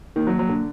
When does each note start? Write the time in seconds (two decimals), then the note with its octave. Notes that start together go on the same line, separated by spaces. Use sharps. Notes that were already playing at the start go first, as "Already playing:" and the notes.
0.16 D#3 A#3
0.27 F#3
0.39 F#3
0.49 D3